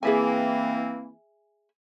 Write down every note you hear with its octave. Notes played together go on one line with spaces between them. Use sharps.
E3 A#3 C4 G#4 E5 G#5